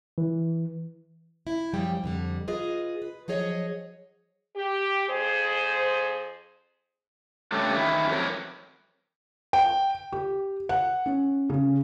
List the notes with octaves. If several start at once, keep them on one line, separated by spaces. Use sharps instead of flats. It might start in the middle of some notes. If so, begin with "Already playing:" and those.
E3
E4
F#2 F3 G3 G5
F2 D3 G3
F4 G#4 B4 D#5
B4
F3 F#3 G#4 C#5 D#5
G4
F2 G#4 C5
C#3 G3 A3 B3 D4 A4
D#3 E3 E4
F2 E3 F#3 A#4
G5
G4
F#5
C#4
C#3